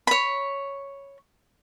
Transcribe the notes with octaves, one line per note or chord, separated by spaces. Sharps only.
C#5 B5